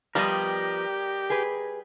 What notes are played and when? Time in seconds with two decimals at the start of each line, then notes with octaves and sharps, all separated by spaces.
0.15 F3 G3 B3 G4 A#4 D#5
1.30 G#4 B4